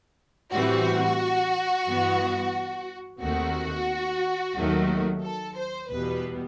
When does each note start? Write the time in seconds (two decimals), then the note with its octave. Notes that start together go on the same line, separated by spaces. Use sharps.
0.51 A2 E3 G3 C4 F#4
1.86 G2 E3 B3
3.21 D#2 D#3 A3 C4 F#4
4.55 D#2 D#3 F#3 A3
5.23 A4
5.57 C5
5.90 E2 B2 G3 B3 B4